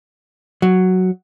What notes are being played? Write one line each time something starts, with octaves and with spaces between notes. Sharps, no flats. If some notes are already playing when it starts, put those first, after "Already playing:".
F#3